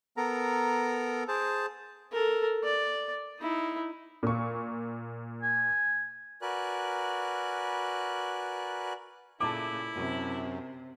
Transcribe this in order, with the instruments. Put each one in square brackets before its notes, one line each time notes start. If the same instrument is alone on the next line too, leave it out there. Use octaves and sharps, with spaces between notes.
[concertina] B3 A4 A#4 A#5
G#4 C5 A5
[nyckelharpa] A4 A#4
D5
D#4 E4
[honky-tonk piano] A#2 C#6
[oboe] G#5
[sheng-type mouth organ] F#4 A#4 B4 D5 G#5 F#6
[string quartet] A#2 C#3 A3 [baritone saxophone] E4 [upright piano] A5 D6
[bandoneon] F#2 [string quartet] C3